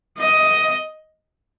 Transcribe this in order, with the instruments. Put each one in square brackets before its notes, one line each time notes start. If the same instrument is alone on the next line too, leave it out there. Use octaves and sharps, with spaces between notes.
[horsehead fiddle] D#5